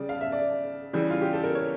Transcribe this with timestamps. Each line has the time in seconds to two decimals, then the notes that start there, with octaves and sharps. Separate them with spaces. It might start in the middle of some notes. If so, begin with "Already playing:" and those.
Already playing: C#3 G3 D5
0.09 F5
0.21 E5
0.32 D5
0.93 C#3 E3 G3
1.10 F4
1.21 G4
1.33 A4
1.44 A#4
1.55 C#5